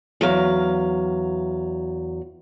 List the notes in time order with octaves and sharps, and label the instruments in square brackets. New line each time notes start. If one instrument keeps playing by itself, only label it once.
[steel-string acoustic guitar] E2 F#3 F5